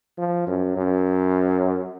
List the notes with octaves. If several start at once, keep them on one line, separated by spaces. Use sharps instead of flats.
F3
F#2
F#2